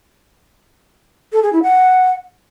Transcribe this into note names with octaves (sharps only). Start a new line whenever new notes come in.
A4
G#4
E4
F#5